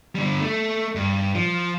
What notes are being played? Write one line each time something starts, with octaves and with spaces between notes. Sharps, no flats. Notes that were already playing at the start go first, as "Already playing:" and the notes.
D3 G3
A3
G2
F3